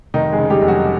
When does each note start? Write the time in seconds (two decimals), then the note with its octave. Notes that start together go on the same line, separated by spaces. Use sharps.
0.14 F1 D#3 D#4
0.32 G#3 G#4
0.39 C#3
0.50 G3 G4
0.62 F1
0.68 F#3 F#4